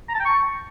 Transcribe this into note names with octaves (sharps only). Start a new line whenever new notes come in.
A#5
A5
G5
C#6